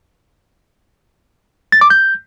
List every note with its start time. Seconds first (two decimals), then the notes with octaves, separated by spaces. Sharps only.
1.72 A6
1.81 D6
1.90 G6